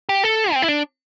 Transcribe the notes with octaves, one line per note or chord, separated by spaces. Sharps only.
G4
A4
C4
E4
D4